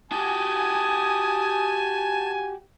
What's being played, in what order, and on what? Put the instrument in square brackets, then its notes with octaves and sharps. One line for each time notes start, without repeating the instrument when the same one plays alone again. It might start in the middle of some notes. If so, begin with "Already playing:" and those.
[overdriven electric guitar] F#4 G4 [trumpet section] G#5 [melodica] A5 [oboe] D#6